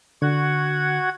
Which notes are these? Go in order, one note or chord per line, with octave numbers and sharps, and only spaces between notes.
D3 F#4 F#5 G#6